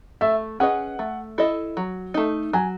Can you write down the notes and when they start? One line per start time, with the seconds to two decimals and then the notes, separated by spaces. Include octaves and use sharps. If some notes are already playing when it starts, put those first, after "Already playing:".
0.21 A3 E5
0.60 C#4 G#4 B4 D#5 F#5
0.99 A3
1.38 E4 A4 D#5
1.77 F#3
2.14 A3 D#4
2.53 F#3 G#5